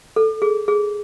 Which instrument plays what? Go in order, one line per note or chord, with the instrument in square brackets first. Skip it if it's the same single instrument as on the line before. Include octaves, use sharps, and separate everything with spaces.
[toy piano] A4
G#4
G#4